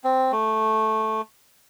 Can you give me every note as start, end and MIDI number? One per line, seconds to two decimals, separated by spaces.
0.04 0.32 60
0.32 1.21 57